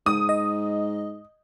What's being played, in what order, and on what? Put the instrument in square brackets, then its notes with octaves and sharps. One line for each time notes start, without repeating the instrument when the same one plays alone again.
[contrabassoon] G#2 [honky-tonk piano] D#6
[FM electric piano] D#5